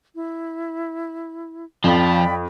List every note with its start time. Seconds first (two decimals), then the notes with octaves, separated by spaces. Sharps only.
0.14 E4
1.84 F2 F3 D5 G5 B5